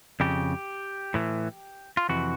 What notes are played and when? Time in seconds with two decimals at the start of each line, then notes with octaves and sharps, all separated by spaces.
0.20 F2 C#3 G4
1.14 A2 E3
1.97 F4
2.09 F2 C3 E3 F#4